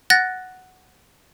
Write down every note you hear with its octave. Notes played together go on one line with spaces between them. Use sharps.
F#5 F#6 A6 A#6